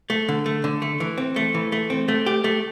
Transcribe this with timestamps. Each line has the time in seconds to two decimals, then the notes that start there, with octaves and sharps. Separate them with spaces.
0.10 A3
0.28 D3
0.46 A3
0.64 D3
0.82 A3
1.00 E3
1.18 C4
1.36 A3
1.54 E3
1.72 A3
1.90 C4
2.08 A3
2.26 G4
2.44 A3